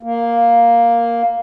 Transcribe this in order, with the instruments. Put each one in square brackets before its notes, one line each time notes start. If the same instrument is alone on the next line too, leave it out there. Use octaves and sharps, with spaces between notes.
[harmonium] A#3